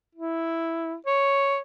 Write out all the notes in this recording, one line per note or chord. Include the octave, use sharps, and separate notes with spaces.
E4
C#5